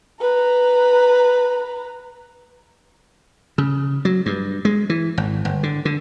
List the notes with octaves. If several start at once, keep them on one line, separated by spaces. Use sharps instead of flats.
B4 A#5
C#3
F#3
G2
G#3
E3
G#1
G1
D3
D3